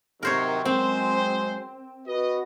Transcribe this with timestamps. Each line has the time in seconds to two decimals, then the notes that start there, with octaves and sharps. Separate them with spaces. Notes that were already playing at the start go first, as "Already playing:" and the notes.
0.23 C3 D#3 F#3 A#4 C5 C#5
0.65 F#3 G#3 C4 C5
2.07 F#4 B4 D#5